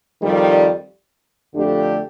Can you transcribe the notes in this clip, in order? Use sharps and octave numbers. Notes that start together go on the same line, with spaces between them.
F2 D#3 G3
F2 D3 A3 D4 G4